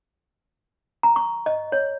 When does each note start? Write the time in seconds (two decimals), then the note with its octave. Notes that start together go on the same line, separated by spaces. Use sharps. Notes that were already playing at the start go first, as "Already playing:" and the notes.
1.03 A#5
1.16 C#6
1.46 D#5
1.72 C#5